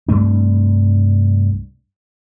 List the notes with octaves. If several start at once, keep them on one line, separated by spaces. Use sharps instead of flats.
C2 G2 A3 D4